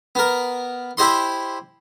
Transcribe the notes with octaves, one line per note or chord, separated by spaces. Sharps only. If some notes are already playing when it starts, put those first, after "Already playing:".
B3 A#4
E4 G4 C5 D#5 C6